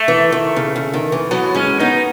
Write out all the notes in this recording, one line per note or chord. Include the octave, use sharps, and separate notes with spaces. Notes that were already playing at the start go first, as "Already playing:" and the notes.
Already playing: A3
E3
D#3
C#3
C#3
D#3
E3
F#3 B3
G#3 C#4
B3 D#4